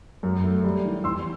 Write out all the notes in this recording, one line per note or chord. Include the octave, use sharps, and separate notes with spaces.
F#2
A3
G3
E3
E2 C6 E6